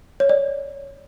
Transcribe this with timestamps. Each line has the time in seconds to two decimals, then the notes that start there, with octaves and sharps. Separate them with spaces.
0.20 C#5
0.29 D5